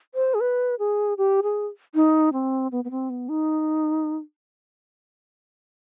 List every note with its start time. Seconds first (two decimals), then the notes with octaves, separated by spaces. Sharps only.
0.15 C5
0.34 G#4
0.40 B4
0.79 G#4
1.18 G4
1.43 G#4
1.95 D#4
2.33 C4
2.72 B3
2.84 B3
2.91 C4
3.10 B3
3.29 D#4